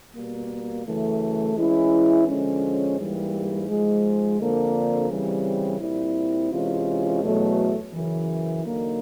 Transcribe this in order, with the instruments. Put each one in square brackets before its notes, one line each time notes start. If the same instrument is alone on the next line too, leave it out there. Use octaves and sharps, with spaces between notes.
[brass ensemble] B2 G3 A#3
F#2 C#3 E3 A3
E3 G#3 C#4 E4
D3 F3 G#3 C#4
G#2 E3 G3 A#3
G#2 F3 G#3
F2 D3 F3 A#3 D4
C#3 E3 G3 C4
A#2 G3 C4 E4
C3 E3 G#3 C#4 F4
E2 B2 F#3 A3
F#2 C#3 E3
D3 F#3 A#3 D#4